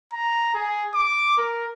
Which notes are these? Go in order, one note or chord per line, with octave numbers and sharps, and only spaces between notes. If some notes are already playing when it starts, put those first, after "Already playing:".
A#5
G#4
D6
A#4